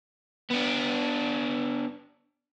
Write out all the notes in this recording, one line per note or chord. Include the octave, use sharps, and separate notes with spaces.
B3 D4